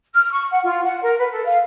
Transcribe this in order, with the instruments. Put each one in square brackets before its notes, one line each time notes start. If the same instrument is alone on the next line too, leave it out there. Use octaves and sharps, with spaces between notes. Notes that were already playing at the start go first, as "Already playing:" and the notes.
[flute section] F6
C#6
F#5
F4
F#5
A#4
B4
A4
F5